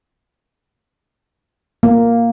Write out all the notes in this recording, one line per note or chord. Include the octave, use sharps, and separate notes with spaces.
A#3